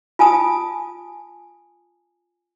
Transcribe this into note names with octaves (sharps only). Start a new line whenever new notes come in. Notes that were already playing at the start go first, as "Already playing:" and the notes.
F4 G#5 A5 D#6